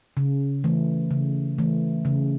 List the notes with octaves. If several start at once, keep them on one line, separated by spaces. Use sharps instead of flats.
C#3
E3 A3
C#3
E3 A3
C#3